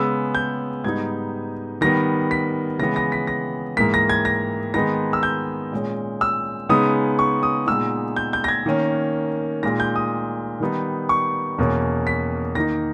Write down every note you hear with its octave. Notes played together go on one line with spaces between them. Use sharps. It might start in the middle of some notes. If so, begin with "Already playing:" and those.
Already playing: C#3 G#3 B3 E6
G6
G#2 G3 B3 D#4 G#6
D#3 G3 B3 A#6
B6
C#3 E3 G#3 B3 A#6
A#6
B6
A#6
G#2 E3 A#3 B6
A#6
G#6
A#6
D#3 G#3 B3 D#4 A#6
E6
G6
A#2 G#3 C#4
E6
C#3 G#3 B3 D#4 D#6
C#6
D#6
A#2 G#3 B3 D#4 E6
G6
G6
A#6
G#6
D#3 A#3 C#4
A#2 G#3 D#4 A#6
G6
D#6
D#3 G3 B3 D#4
C#6
E2 B2 A#3 C#4
B6
D#3 A#3 D#4 A#6